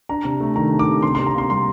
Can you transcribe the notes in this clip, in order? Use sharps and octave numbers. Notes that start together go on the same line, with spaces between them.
D4 A#5
C3
A3
D#3 A#5
D4
D6
C3
C3 C6
C3 C6
A#5
A#3 C6
G3 C6